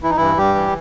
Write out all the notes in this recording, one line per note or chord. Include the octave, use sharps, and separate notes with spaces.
E3 E4
D#4
G2 E3 E4
G2 G3 G4
E3